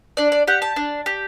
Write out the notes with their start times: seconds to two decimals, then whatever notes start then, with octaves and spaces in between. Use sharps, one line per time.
0.17 D4 D5
0.32 D5
0.48 G4 F#5
0.62 A5
0.76 D4
1.06 G4